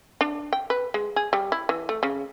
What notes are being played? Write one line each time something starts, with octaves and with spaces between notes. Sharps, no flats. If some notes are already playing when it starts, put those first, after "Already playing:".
D4
G5
B4
G#3
G#4
G3
E4
E3
A3
C#3